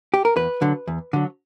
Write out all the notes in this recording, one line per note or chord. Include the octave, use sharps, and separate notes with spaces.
G4
A#4
E2 B4
D3 F#3
E2
D3 F#3